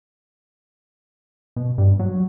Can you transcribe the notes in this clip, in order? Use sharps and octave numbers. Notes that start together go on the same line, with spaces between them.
B2
G2
F#3